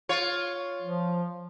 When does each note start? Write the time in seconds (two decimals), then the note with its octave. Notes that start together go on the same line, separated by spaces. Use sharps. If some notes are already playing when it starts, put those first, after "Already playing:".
0.09 F4 C#5
0.82 F3